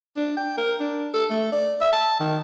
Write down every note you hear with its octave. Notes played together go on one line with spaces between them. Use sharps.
D4
G5
A#4
D4
A4
A3
D5
E5
A5
D#3